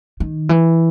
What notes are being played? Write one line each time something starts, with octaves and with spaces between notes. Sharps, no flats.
D#3
E3